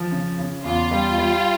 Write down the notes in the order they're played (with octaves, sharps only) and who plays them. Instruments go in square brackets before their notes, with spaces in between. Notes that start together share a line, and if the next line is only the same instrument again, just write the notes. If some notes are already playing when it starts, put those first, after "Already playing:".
Already playing: [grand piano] F3
C#3
C#3
[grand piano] E2 [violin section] F4
[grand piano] G3
G3